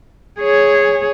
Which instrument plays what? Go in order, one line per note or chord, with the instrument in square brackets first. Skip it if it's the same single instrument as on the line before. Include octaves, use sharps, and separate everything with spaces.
[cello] G#4 C#5